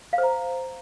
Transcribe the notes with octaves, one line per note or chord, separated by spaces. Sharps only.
F5
C5
A#5